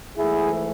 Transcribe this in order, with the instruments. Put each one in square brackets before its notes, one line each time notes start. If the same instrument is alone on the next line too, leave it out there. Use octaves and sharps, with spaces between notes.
[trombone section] G#2 E3 A3 E4 G#4